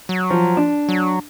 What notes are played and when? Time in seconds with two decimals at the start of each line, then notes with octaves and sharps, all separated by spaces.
0.09 F#3
0.30 F3
0.57 D4
0.89 F#3